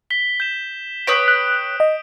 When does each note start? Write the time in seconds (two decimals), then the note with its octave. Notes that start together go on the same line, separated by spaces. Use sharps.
0.10 B6 G7
0.40 G6 E7
1.07 B4 C#5 G5 D#6 D7
1.28 F#6
1.80 D#5